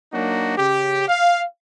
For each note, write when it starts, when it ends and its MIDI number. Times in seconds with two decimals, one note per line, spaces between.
0.12 0.54 54
0.12 0.54 58
0.12 0.54 62
0.12 0.54 63
0.12 0.54 66
0.57 1.04 49
0.57 1.04 67
1.08 1.42 77